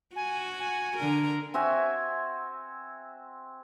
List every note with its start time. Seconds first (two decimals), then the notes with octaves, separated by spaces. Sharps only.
0.16 F#4 G#5
0.60 G#5
0.97 D3 A#4
1.54 C4 F#4 E5 G#5